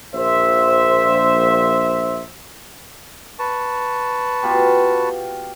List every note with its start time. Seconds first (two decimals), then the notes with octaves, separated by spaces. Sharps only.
0.15 A#1 C5 E5
3.39 B4 A5 C#6
4.43 B2 F4 G4